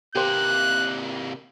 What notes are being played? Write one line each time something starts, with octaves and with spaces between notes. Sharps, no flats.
C3 A#3 G4 C5 F#6